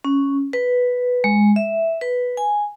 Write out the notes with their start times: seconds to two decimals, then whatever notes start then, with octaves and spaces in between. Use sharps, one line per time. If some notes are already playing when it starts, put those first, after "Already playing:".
0.05 C#4
0.53 B4
1.24 G#3
1.56 E5
2.01 B4
2.37 G#5